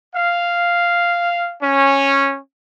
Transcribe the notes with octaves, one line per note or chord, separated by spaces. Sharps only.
F5
C#4